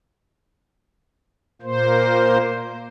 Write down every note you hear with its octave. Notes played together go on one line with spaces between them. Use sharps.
A#2 A#3 C5